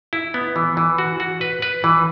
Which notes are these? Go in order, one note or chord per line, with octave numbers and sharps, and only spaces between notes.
E4
B3
E3
E3
F#4
F#4
B4
B4
E3